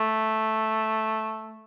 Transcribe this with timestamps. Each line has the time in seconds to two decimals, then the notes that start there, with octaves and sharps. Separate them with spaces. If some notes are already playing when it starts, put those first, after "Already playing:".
Already playing: A3